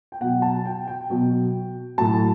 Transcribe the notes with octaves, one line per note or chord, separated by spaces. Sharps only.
G5
B2 F#3 F#5
A5
G5
G5
B2 F#3
A2 F#3 A5